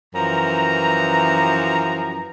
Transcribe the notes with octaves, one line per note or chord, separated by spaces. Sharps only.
F#2 E3 F3 A#5